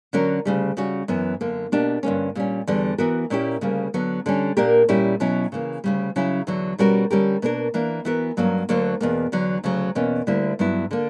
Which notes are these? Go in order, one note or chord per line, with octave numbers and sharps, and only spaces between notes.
D3 F#3 C#4 F#4 A#4
D2 C#3 G3
C#3 G3 C#4 F#4
F#2 E3 B3
F#2 D3 A#3
B2 A#3 D4 G4
G2 D3 A#3 C#4
A#2 G3 C#4
E2 D3 G3
E3 B3 F#4 A#4
A#2 A#3 C#4 E4 G4
D2 C#3 G3 A#3
D3 F#3 B3
D3 G3 C#4
A#2 A#3 D4 G4 A#4
A#2 G3 C#4 E4 G4
B2 F#3 C#4 E4
C#3 E3 A#3
D2 C#3 G3
C#3 F#3 C#4 E4
E2 D3 F#3
B2 G3 C#4 F#4 A#4
D3 G3 C#4 G4 A#4
B2 A#3 D4 A#4
E3 A#3 D4
E3 B3 F#4 A#4
G2 F#3 A#3 C#4 F#4
D2 D3 F#3 A#3
E2 B2 A#3
E2 D3 F#3
D2 C#3 F#3
E2 B2 A#3 C#4
D2 D3 G3 A#3 E4
G2 F#3 B3 E4
D3 A#3